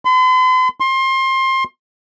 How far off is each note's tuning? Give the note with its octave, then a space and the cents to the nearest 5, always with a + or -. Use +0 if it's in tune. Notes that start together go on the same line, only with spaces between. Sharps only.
C6 -45
C6 +25